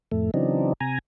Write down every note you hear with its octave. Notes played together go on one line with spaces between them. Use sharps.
F2 A2 A3
C#3 E3 F#3 C4 D4 D#4
C3 G#5 A#5